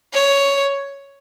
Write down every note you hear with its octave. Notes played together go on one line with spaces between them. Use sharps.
C#5